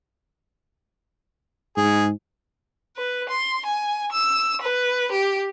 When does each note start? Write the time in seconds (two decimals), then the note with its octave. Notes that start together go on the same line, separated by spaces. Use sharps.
1.77 G#2 G#4
2.97 B4
3.29 C6
3.65 G#5
4.13 E6
4.62 B4
5.12 G4